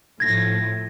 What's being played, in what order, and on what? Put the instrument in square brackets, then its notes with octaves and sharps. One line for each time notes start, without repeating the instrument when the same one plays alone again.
[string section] A2 F3 [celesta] G#6 A#6